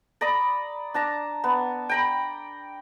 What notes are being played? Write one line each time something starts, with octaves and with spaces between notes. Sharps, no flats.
D5 A#5 B5 D#6
D4 A5 A#5
B3
G5 A#5 B5